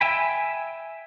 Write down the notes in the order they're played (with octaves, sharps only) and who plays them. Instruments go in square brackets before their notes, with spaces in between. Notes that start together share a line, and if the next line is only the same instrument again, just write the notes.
[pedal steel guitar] E5 G5 G#5 B5